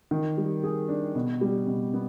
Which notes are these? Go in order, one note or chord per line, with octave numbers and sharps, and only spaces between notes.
D#3
G3
G#4
D4
B2
G3
B2
B3